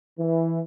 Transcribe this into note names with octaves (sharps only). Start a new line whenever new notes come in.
E3